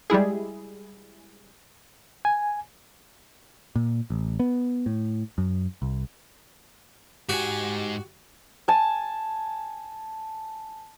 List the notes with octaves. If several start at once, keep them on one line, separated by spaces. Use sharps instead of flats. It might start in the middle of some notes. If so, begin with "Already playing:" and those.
G3 G#3 E4 G#4
G#5
A#2
A1
B3
A2
F#2
C2
G#2 F#4 G4 G#5
G#5 A5